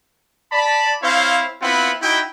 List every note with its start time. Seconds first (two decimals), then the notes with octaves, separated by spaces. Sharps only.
0.52 D5 A5 B5
1.03 C4 E4 C5 C#5 F5
1.62 B3 C4 E4 F4 F#5 B5
2.02 D#4 E4 F#4 G5